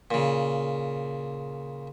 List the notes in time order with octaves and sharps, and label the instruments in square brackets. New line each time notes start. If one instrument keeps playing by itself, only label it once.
[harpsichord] A#2 C#3